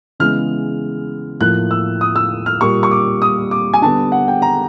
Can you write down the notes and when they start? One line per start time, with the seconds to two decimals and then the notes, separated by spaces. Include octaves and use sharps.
0.20 C#3 E3 G#3 B3 F6
1.41 A2 F3 A#3 F#6
1.71 E6
2.01 D#6
2.16 E6
2.46 F6
2.61 A#2 G3 A#3 C#6
2.83 C#6
2.91 D6
3.22 D#6
3.51 D6
3.74 G#5
3.82 D3 G3 B3 A5
4.12 F#5
4.28 G5
4.42 A#5